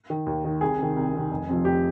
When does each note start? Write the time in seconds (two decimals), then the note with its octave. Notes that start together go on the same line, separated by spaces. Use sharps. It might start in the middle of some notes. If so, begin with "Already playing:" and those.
0.10 D#3
0.26 D#2
0.45 D#3
0.61 C2 G#4
0.79 C3 D#3
0.96 C2
1.13 C3 D#3
1.31 F1
1.48 F2 C3 F3
1.65 F1 G4